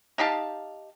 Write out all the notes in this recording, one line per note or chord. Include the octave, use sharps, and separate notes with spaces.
D#4 G4 F5 A5